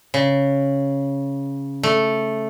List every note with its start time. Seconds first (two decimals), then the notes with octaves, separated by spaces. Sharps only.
0.14 C#3
1.83 A3